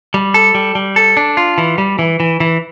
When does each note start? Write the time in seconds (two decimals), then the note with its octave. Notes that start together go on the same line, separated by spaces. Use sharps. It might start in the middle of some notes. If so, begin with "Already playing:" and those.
0.14 G3
0.34 A4
0.55 G3
0.75 G3
0.96 A4
1.17 D4
1.37 F4
1.58 E3
1.78 G3
1.99 E3
2.20 E3
2.40 E3